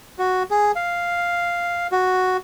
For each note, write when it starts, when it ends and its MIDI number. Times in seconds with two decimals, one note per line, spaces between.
0.19 0.43 66
0.50 0.72 68
0.76 1.87 77
1.92 2.37 66